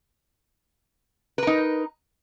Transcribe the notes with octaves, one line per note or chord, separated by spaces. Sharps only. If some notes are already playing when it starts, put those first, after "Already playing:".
D#4 A#4 B4